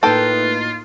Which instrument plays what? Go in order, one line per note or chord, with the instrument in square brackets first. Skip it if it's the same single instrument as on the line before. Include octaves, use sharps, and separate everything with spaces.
[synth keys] A2 A#3 D#4 [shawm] F4 [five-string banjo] A4 G5 [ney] B4